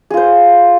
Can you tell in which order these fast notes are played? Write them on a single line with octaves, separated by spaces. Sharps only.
G#4 F4 C5